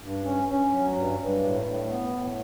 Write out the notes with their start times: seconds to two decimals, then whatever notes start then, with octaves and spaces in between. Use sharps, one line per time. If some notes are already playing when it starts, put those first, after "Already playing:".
0.02 G2
0.25 C#4
0.48 C#4
0.72 F#3
0.96 G2
1.19 G2
1.43 A2
1.66 A2
1.89 B3
2.13 A2